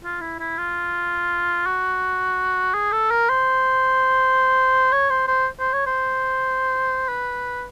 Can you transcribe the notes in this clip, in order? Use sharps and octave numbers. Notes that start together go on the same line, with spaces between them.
F4
E4
E4
F4
F#4
G#4
A4
A#4
C5
C#5
C5
C5
C5
C#5
C5
B4